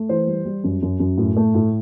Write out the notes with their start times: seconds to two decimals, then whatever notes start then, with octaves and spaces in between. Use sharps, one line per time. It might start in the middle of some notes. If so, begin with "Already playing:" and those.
Already playing: A3
0.09 E3 C5
0.27 G3
0.45 G3
0.64 F#2
0.82 F#2
1.00 F#2
1.18 A2
1.37 A3
1.55 A2